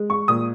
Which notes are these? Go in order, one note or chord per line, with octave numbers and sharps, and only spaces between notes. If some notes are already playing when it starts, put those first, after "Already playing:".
Already playing: G#3
C#6
A#2 D#6